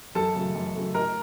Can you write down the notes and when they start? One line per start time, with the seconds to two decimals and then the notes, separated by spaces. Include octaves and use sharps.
0.15 F#2 A4 A5
0.35 C#3 F#3 A3
0.55 F#2
0.75 C#3 F#3 A3
0.94 A2 A#4 A#5